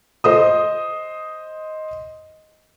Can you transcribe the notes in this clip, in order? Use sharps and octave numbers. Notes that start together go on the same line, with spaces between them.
C5 D#5 D#6